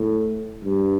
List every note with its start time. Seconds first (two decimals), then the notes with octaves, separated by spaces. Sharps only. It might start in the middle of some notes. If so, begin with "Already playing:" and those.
Already playing: A2
0.63 G2